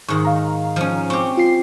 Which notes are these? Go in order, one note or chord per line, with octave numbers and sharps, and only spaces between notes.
G#2 D#3 C#6
F5 A#5
F3 C#4
C4 G4 C#6
F4 C7